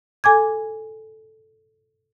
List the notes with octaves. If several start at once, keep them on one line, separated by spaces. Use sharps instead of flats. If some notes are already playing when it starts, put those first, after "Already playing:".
A4 G#5 D6 G#6